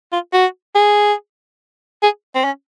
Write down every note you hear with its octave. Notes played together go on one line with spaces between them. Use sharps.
F4
F#4
G#4
G#4
C4
C#4